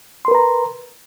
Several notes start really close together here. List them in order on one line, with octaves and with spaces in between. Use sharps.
C6 A#4 B4 A#5